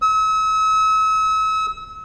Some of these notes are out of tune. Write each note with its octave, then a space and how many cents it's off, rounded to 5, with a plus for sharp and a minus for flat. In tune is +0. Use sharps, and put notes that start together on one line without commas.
E6 -40